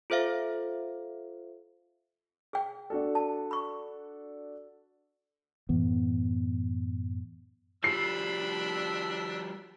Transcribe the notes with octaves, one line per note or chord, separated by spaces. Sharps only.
F4 A4 C5 E5 F5
G#4 G5
D4 F#4 A4
A5
B5 C#6
F#2 A2 E3 B3
F3 G3 D4 B5 E6 C7